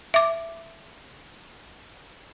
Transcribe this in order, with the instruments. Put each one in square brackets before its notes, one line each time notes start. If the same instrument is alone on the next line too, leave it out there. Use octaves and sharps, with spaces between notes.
[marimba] E5 D6